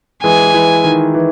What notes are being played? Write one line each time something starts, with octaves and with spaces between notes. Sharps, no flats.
E3 G#3 G#5
E3
D#3
E3